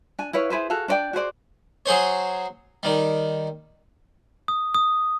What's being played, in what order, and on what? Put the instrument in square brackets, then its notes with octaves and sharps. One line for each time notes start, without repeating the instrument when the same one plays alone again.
[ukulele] D4 G#5
E4 B4 C#5 F5
E4 G#4 B4 C5
F#4 G#4 A4 F5
D4 C5 D5 G5
F#4 G#4 C5 D5
[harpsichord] F#3 G#4 C5 C#5
D#3 G3
[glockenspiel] D#6
D#6